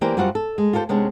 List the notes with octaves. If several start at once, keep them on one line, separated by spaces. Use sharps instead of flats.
E3 A#3 G4 A#4 C5 D5
F#2 G3 F4 F#4 C5 F#5
A4
G#3
F4 G4 A4 A#4 C5
C3 G#3 B3 C#4 D4